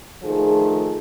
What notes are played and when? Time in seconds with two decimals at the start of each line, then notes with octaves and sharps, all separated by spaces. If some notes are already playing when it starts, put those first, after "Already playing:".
0.23 D#3 F3 A3 D#4 G#4